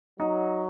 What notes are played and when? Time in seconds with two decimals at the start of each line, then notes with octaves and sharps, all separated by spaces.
0.20 F#3 D#4